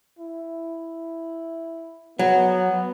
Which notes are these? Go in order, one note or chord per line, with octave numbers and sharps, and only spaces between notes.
E4
F#3 B3